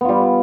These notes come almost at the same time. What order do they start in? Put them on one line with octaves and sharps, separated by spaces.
B3 F4 G3